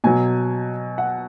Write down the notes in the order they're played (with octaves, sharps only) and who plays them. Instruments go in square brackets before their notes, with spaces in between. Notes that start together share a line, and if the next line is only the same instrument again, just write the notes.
[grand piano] B2 F#3 G#5
F#5